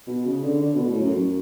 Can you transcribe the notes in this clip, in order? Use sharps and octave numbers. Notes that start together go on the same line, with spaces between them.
B2
C#3
D3
D3
B2
A2
F#2
F#2